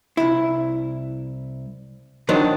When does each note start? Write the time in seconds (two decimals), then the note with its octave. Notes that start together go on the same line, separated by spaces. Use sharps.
0.17 C2 E4
2.29 D#3 F#3 D4 D#4 C5